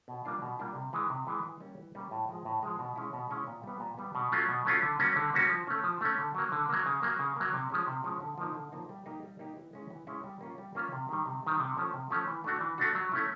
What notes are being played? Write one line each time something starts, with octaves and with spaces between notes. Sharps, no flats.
B2
G3 A#3 D4 F4
B2
G3 A#3 D4 F4
C3
E3 G#3
C3
E3 G#3
E3
G3 A#3 C#4
E3
G3 A#3 C#4
A2
F3 G#3
A2
F3 G#3
B2
G#3 C#4 E4
B2
G#3 C#4 E4
A#2
G3 B3
A#2
G3 B3
B2
F#3 A3 C#4 F4
B2
F#3 A3 C#4 F4
D3
G3 A#3 C#4 F#4
D3
G3 A#3 C#4 F#4
F3
A3 C#4
F3
A3 C#4
D3
F#3 A#3
D3
F#3 A#3
C#3
F#3 A#3
C#3
F#3 A#3
C3
F3 G#3 C#4
C3
F3 G#3 C#4
D3
F3 A#3 D#4
D3
F3 A#3 D#4
G3
A#3 D#4 G4
G3
A#3 D#4 G4
E3
G#3 C#4 E4
E3
G#3 C#4 E4
G3
A#3 C#4 F4
G3
A#3 C#4 F4
C3
D#3 G3
C3
D#3 G3
C3
F3 A3 C#4
C3
F3 A3 C#4
E3
A3 D4 F#4
E3
A3 D4 F#4
F#3
A3 C#4 E4